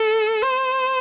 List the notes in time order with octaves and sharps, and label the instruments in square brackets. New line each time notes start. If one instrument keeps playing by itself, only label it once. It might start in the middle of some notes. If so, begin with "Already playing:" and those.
Already playing: [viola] A4
C5